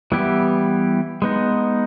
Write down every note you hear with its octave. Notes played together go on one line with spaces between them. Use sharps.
E3 G3 B3 E4 G4
G#3 B3 D#4